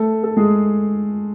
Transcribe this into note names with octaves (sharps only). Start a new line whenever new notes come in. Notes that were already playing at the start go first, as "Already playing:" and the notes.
Already playing: A3 A4
A4
G#3 G#4